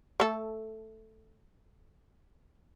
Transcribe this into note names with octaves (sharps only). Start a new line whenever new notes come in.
A3 A4